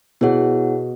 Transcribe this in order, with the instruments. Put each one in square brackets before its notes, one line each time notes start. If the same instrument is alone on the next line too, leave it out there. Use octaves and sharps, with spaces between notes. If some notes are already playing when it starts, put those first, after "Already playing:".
[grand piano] B2 [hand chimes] B3 E4 G#4 C#5 F#5